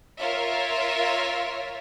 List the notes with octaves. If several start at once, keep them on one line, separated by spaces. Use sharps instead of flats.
F4 A#4 C#5 E5